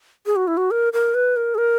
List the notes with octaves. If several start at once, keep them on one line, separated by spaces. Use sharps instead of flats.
G#4
F#4
E4
F#4
A#4
A#4
B4
A#4
G#4
A#4